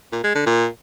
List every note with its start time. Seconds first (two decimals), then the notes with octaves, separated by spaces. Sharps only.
0.13 A#2
0.24 G#3
0.35 D3
0.46 A#2